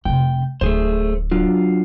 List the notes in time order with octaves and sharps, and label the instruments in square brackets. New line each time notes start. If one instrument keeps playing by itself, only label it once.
[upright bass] F1 C3 [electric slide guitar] G5
[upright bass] D1 [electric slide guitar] A3 G#4 C5
[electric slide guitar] F#3 D4 F4